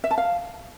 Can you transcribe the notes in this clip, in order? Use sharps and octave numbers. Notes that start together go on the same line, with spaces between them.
E5
A5
F5